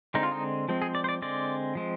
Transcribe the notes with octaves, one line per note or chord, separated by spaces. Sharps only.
D3 G#3 C4 D#4
F4
D#4
F3 G#3 C4
G#4
D5
C5
D5
D3 G#3 C4 D5
F3 G#3 C4